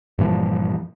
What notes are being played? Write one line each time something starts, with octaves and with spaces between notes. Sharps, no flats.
G2 A#2 E3 F3